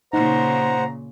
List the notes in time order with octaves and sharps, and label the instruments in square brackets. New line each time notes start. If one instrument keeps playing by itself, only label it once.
[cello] A#2 C#3 [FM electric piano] D#4 [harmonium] C5 F#5 [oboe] A#5